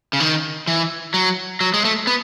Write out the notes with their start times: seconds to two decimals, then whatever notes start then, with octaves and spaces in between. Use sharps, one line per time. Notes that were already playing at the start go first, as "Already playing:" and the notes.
0.13 C#3
0.20 D#3
0.67 E3
1.14 F#3
1.61 F#3
1.74 G#3
1.85 A3
2.07 B3